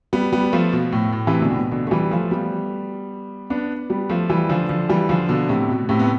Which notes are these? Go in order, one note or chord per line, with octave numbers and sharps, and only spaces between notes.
G3 B3
G3 B3
F3 A3
B2
A2
A2
C3 E3
B2 D3
A2
B2
B2 D3
A3
E3 G3
F3 A3
G3 B3
B3 D4
G3 B3
F3 A3
E3 G3
D3 F3
D3 F3
E3 G3
D3 F3
B2 D3
A2 C3
B2
A2 C3
B3